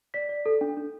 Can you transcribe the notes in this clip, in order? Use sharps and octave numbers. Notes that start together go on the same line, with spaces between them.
D5 B6
D5
A4
D4
D4